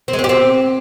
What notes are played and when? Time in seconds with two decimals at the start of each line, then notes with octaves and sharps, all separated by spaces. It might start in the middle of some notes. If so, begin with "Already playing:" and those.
0.08 C4
0.13 G#3
0.19 C4
0.24 G4
0.29 C4